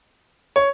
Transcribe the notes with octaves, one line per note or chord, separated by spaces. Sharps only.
C#5